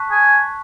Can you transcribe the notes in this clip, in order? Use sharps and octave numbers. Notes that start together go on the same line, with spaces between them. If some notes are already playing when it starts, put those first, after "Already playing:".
Already playing: A5 C#6 F#6 B6
G#5